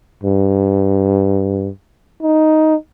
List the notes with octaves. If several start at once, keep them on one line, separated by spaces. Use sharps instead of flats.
G2
D#4